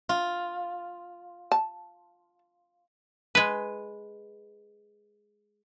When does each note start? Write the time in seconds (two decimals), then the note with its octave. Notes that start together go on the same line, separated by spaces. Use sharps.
0.09 F4
1.52 A5
3.35 G#3 B4